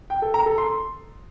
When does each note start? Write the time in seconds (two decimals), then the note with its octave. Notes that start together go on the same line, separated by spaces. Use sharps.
0.10 G5
0.22 A4
0.34 A#5
0.46 A4
0.58 C6